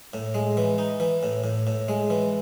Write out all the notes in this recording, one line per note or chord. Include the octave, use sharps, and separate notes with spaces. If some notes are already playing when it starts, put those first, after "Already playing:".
A2
G#3
E3
D#4
E3
A2
A2
A2
G#3
E3